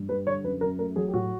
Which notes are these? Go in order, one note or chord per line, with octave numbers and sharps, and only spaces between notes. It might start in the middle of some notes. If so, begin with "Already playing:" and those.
Already playing: G2
G3 B4
D3 C#5
F#2 B4
F#2 A#4
A3 A#4
F#3 G#4
G4
A2 F#4